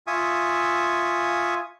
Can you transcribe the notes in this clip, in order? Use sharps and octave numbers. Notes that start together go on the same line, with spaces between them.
F4 E5 G#5 C#6 D#6